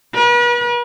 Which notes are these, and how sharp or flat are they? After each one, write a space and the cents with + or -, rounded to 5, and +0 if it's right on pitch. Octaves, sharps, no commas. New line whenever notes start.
B4 -40